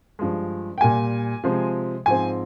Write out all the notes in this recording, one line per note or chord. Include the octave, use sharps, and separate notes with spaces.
G2 F3 G#3
G5
A#2 G3 A#3 G#5
C3 F3 G#3 C4
G#2 F3 C4 G#5